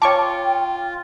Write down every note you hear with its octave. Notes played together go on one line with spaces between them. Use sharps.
F4 C#5 G5 A5 C#6 D6